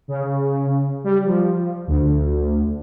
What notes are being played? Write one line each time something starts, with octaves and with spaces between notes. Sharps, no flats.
C#3
G3
F3
D2